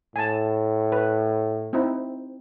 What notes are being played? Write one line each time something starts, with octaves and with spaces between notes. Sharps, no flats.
A2 G#5 A5
B4
C4 D#4 E4